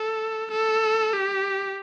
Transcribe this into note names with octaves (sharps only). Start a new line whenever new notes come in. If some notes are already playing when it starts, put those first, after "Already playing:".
Already playing: A4
A4
G4